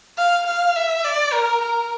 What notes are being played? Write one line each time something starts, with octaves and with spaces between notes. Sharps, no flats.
F5
F5
E5
D5
A#4
A#4